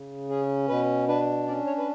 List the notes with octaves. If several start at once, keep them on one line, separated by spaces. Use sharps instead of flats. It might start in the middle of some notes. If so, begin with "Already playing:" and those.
Already playing: C#3
C#4 G#4
B2 B4
D4 B4
C#4 D5
C#5
B4